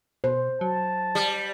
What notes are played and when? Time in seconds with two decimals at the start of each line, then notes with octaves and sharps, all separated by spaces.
0.24 B2 C5
0.61 F#3 A5
1.15 G3